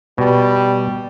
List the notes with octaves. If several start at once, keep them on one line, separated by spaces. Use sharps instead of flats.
B2 G3